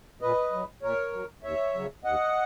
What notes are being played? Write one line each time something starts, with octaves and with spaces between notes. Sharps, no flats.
A#2 B4 D#5
F#3
A#2 A#4 C#5
F#3
D#2 C#5 E5
C#3 F#3
D#2 D#5 F#5